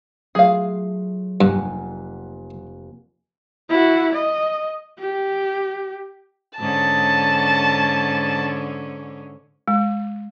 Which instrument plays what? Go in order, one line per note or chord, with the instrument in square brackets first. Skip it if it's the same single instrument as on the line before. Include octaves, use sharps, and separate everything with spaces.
[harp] F#3 A3 F4 [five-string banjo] G#4 F5
[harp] F1 A#3 F#5 [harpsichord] G2
[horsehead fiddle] E4 F#4
D#5
G4
[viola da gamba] G#2 D3 C#4 [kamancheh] A5
[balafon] G#3